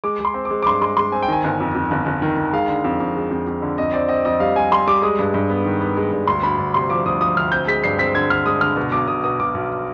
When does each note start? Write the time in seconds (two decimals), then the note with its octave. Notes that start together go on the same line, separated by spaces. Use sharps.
0.04 G#3 D6
0.20 G#3 C6
0.34 C4
0.45 D6
0.50 G#3
0.63 D6
0.66 G2 C6
0.81 G#3 C6
0.97 G#3 C6
1.12 C4 G#5
1.22 G5
1.28 D#3 G#5
1.44 G1
1.60 F2
1.75 F2
1.91 G1
2.06 G1
2.22 D#3
2.37 D#3
2.53 G#3 F5
2.68 D3
2.84 F2
3.00 F2
3.15 G#3
3.31 F2
3.47 F2
3.62 D3
3.78 F2 D#5
3.93 C4 D5
4.09 C4 D#5
4.25 F2 D#5
4.40 G3 F5
4.56 G3 G#5
4.72 G3 C6
4.87 G3 D6
5.02 G#3 D#6
5.19 G2
5.34 G2
5.50 B3
5.65 D#3
5.81 B3
5.97 G#3
6.12 G2
6.27 D2 C6
6.43 D2 B5
6.59 D2
6.74 C3 C6
6.89 F3 D6
7.05 D2 D#6
7.21 F3 D#6
7.37 D2 F6
7.52 C4 G6
7.67 G#3 B6
7.84 G2 C7
7.98 C4 B6
8.15 D3 G#6
8.30 D3 F6
8.46 G#3 D#6
8.61 D3 F6
8.77 B2
8.92 B1 D6
9.08 B2 D#6
9.24 B2 D#6
9.39 B1 D6
9.54 B1